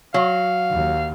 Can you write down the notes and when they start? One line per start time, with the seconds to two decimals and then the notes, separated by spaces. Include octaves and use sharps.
0.14 F#3 F5
0.70 D#2